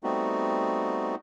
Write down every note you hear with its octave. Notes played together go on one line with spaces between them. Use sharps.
G3 A3 B3 C4 D#4 F#4